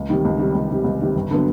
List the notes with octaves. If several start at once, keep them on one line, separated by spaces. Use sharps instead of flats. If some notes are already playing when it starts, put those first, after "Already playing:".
Already playing: C#2
C3 D#3 G3
C#2
C3 D#3 G3
C#2
C3 D#3 G3
C#2
C3 D#3 G3
G1
D3 F#3 B3